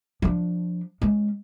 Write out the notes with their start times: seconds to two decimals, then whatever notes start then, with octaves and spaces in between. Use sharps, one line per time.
0.22 F3 D4
1.01 G#3 C#4